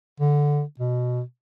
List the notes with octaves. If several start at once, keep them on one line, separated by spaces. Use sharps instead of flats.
D3
B2